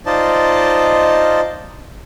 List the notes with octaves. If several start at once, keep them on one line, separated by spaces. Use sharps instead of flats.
D#4 F4 C5 D5 D#5 A5